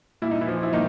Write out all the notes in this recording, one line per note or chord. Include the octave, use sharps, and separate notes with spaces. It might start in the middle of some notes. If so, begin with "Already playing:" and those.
A#2 E4
D#4
E3 E4
F3
E4
A#2 D#3 D#4